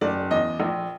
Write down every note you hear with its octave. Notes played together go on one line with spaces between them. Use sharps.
F#1 D5
E2 D#5
A#1